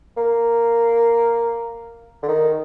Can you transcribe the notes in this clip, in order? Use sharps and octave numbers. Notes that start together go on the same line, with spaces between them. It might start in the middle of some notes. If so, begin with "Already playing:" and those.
A#3
D3
D#3